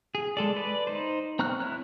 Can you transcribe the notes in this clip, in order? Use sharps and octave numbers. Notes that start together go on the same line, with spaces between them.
G#4
G#3 A4 D5
B4 D5
D#4 C5
C4 A#5 C#6 F6 F#6
E4 C#5 F#6